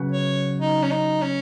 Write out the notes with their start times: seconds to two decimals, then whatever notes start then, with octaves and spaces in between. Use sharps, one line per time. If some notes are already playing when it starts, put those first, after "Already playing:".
Already playing: C#3 F#3 B3
0.12 C#5
0.60 D#4
0.83 C#4
0.91 D#4
1.22 C#4